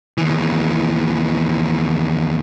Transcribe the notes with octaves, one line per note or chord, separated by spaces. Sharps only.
D#2 E3